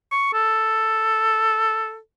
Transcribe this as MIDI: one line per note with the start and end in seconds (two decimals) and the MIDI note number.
0.12 0.32 85
0.34 1.99 69